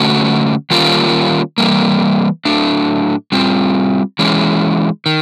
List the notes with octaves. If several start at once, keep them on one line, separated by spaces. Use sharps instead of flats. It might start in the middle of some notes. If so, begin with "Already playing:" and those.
Already playing: D3 F#3 A3 C#4 F#4
D#3 G3 A#3 C#4 F4
E3 G3 A#3
A2 F#3 A3 D4
G3 C4 F4
E3 G#3 C#4
D#3